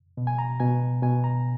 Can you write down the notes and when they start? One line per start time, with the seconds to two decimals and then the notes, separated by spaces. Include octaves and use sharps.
0.17 B2
0.27 G#5
0.39 A#5
0.60 B2 G#5
1.02 B2 G#5
1.24 A#5